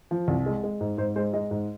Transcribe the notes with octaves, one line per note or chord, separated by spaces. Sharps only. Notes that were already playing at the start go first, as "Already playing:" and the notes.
F3
C2
G#3
G#3
G#2
G#2 C5
G#3 C5
G#3 D#5
G#2